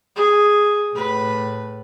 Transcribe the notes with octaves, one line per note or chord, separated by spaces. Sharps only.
G#4
A2 B4